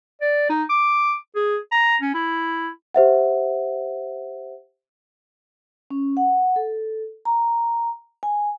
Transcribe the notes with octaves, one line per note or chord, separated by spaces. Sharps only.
D5
D#4
D6
G#4
A#5
C#4
E4
G4 C5 E5 F#5
C#4
F#5
A4
A#5
G#5